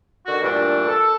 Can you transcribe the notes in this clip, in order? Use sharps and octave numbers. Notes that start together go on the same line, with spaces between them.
D3 D#3 F#4
G2 A#2 E3 A3 D4
A4